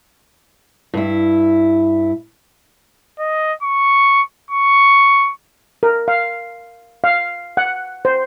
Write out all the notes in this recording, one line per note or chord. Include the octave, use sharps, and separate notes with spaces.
G2 E4
D#5
C#6
C#6
A#4
F5
F5
F#5
C5